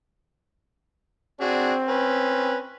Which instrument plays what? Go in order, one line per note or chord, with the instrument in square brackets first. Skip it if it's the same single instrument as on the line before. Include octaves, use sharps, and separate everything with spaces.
[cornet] C4 [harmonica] D4 F#4 G#4
[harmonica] C#4 B4